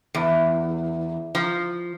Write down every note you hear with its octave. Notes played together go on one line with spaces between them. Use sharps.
E2
F3